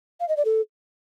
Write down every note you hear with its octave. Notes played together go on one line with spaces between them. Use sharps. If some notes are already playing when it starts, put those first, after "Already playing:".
F5
D#5
D5
A4